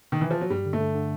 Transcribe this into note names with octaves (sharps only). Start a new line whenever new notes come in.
D#3
E3
F3
F#3
G2 G3
D3
A3
D3
D3